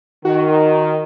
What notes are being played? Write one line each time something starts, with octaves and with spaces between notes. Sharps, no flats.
D#3 F#4